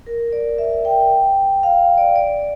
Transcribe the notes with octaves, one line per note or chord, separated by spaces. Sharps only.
A#4
D5
E5
G5
F5
D5
D5